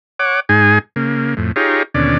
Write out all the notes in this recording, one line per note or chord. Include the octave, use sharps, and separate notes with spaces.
C#5 F#5 D6
G#2 D#4 G#4 G#5
C#3 A#3
F2 A2
D#4 F4 G4 G#4 C#5 A#5
D#2 B2 D3 C#4 D5